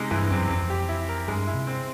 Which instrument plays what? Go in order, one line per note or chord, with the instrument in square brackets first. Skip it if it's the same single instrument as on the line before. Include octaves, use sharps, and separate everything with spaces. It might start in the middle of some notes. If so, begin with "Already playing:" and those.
Already playing: [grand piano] C3 G#3 D#4
[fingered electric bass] G2 [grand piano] E3
[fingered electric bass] F#2 [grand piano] C4
[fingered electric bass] F2 [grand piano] C4
[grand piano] G4
E4
A#4
[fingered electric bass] G2 [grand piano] G#3
[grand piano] E4
[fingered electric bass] C3
[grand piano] C4